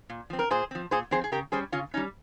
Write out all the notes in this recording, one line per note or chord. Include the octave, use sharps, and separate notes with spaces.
A#2
F3 C4
A#4
A#2 G#4 C5
F3 C4
A#2 G#4 C5
F3 C4 G#4 C5
G#4
C#3 G4 A#4
G3 C#4 G#4 C5
C#3 C#4 F4
G3 C#4 D#4